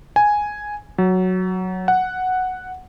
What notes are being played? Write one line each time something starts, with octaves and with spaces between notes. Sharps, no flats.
G#5
F#3
F#5